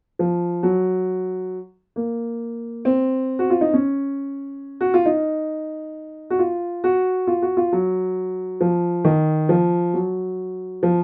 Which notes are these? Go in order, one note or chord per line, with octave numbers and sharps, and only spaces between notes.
F3
F#3
A#3
C4
F#4
F4
D#4
C#4
F#4
F4
D#4
F#4
F4
F#4
F4
F#4
F4
F#3
F3
D#3
F3
F#3
F3